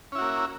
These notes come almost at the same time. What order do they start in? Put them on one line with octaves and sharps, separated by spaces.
C#4 E4 F#4 A#3